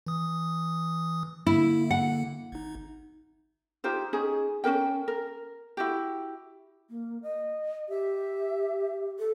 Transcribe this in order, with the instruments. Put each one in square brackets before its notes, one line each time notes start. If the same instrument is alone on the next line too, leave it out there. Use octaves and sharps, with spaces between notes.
[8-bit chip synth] E3 D#6
[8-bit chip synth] D3 A#3 [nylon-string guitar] E4
[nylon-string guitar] F#5
[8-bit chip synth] G#1 D#4
[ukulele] D#4 F4 G4 C5
C#4 D#4 G#4
C#4 D4 A#4 G5
A#4
E4 F#4 G4
[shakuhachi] A#3
D#5
[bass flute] G4 [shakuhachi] E5
[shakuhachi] A4